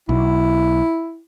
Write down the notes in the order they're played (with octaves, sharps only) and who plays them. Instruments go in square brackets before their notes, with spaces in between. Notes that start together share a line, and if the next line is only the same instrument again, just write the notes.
[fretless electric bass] B1 [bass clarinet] E4